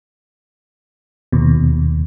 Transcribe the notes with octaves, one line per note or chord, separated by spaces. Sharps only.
D#2 B2